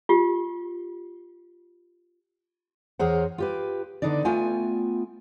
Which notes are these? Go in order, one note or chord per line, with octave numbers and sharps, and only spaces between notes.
F4 G4
E2 G#4 A#4 C5 C#5 F#5
F4 G4 B4
D3 B3 D4 D#4 D5
A3 B3 F4 G5 G#5